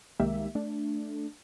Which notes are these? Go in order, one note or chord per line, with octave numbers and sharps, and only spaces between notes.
C2 D#3 G#3 A#3 G4 E5
A3 D4